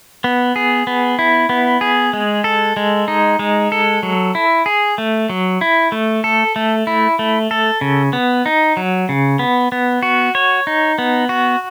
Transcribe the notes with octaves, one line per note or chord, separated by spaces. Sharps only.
B3
G#4
B3
E4
B3
G#4
G#3
A4
G#3
D#4
G#3
A4
F#3
E4
G#4
A3
F#3
E4
A3
A4
A3
E4
A3
A4
C#3
B3
D#4
F#3
C#3
B3
B3
F#4
C#5
D#4
B3
F#4